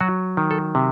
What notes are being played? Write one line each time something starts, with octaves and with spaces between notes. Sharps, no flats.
F#3 F#4
D#3
A4
C3